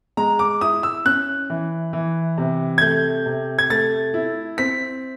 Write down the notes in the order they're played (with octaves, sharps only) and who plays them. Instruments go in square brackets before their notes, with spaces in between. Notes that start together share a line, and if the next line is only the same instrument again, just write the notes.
[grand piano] G#3 A#5
D6
E4 D#6
E6
C#4 F#6
E3
E3
C3
G#6
A3 G6
C3
G#6
A3 A6
E4
C4 B6